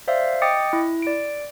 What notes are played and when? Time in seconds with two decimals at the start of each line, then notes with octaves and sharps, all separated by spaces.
0.08 C5 D5 E5 F5
0.42 D#5 G5 D6 D#6 A6 C#7
0.73 E4
1.02 D5 D7